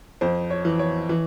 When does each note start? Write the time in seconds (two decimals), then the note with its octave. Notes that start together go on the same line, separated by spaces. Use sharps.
0.21 F2 C5
0.50 C#5
0.65 E3
0.79 C#5
1.09 E3